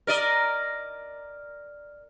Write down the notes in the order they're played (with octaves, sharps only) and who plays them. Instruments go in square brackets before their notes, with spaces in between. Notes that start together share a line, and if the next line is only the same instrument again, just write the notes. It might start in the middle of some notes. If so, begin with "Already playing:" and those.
[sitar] A#4 D5 D#5